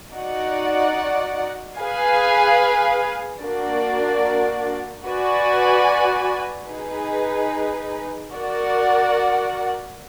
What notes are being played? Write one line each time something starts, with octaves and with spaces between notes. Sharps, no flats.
D#4 F#4 D5 F#5
G#4 B4 F5 G#5
A#3 D4 F#4 A#4 D5
F#4 B4 D5 G#5
D#4 G#4 B4
F#4 A#4 D5 F#5